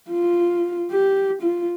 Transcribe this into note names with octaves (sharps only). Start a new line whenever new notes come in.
F4
G4
F4